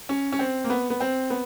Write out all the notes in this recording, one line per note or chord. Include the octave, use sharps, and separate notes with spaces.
C#4
C#4
C4
A#3
B3
B3
C4
B3